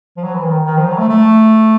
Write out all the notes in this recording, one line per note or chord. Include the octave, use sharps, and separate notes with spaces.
F3
F#3
E3
D#3
D#3
F3
F#3
A3
A3